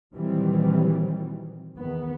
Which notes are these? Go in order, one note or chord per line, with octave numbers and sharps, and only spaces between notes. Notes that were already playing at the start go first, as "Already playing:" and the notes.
A#2 D#3 E3 F#3 G3 C4
E2 D#3 B3